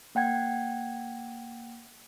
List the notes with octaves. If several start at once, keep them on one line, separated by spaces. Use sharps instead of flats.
A#3 F#5 G5 G#6